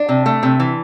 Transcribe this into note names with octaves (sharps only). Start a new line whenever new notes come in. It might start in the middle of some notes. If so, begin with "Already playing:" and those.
Already playing: D4
C3
A3
C3
E3